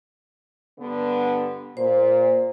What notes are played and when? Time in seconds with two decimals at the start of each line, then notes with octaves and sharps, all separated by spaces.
0.79 G2 D3 B3
1.77 A#2 C5